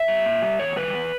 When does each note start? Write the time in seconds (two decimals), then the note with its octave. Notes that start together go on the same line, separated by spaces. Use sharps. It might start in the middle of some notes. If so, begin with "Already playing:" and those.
Already playing: E5
0.08 G3
0.26 A#2
0.42 G3
0.59 E2 C#5
0.76 D#3 G3 B4
0.93 E2